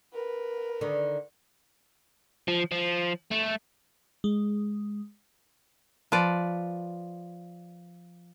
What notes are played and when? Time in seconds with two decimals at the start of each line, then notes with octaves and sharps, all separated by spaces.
0.14 A#4 B4
0.81 D3 D#3
2.48 F3
2.72 F3
3.31 A3
4.24 G#3
6.12 F3 B4 D5